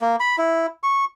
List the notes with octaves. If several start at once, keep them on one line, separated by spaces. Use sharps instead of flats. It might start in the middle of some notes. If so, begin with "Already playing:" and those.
A#3
B5
E4
C#6